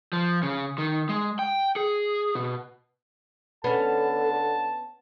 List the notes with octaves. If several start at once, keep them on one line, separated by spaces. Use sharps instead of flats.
F3
C#3
D#3
G#3
G5
G#4
B2
D3 B3 C#4 A4 A5